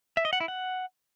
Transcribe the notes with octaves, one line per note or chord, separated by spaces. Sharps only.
E5
D#5
F#5
E4
F#5